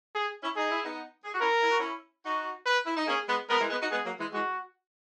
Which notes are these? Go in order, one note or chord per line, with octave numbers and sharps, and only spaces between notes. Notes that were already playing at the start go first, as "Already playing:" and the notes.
G#4
C#4 E4
D#4 G#4
E4
B3 D#4
G#4
F#4
C#4 E4 A#4
E4
F#4
C#4 E4
D#4 F#4
B4
E4
D#4
A#3 C#4 G#4
G#3 B3
G#3 B3 A#4
E3 G#3
G#3 B3
D#4 F#4
G#3 B3 G#4
F#3 A#3
E3 G#3
E3 G#3 F#4